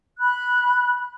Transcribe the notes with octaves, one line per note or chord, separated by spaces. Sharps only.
B5 F#6